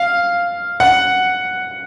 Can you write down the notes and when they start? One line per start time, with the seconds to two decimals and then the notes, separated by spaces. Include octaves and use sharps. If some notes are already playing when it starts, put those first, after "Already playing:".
Already playing: F5
0.80 F#5